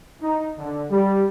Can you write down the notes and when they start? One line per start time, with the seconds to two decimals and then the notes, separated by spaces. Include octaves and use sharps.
0.21 D#4
0.57 D3
0.90 G3